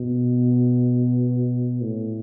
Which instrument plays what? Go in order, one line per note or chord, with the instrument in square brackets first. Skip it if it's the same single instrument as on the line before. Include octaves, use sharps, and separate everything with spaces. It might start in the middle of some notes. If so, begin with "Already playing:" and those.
Already playing: [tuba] B2
A2